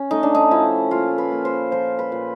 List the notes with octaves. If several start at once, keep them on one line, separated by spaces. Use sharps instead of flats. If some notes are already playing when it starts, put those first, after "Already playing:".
Already playing: C#4
A3 D#4
D4
D#4
F3 E4
A#2 F4
B4
A#3
C5
F3 C5
B4
A#2